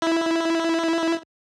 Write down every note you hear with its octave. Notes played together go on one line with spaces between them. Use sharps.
E4